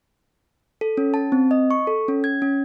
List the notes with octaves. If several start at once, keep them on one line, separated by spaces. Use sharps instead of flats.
A4
C#4
A5
C4
D#5
C#6
A4
C#4
G#6
C#4